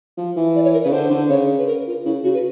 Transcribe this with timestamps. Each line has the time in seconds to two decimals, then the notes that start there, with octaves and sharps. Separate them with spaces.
0.17 F3
0.36 E3
0.55 D5
0.64 C#5
0.73 A#4
0.83 C#3 B4
0.92 D3 C5
1.11 D3
1.29 C#3 C#5
1.58 B4
1.67 A#4
1.87 F4
2.05 C#3 E4
2.23 C#3 F#4
2.34 B4